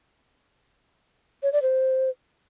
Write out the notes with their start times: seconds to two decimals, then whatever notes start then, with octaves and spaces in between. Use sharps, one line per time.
1.43 C#5
1.53 D5
1.62 C5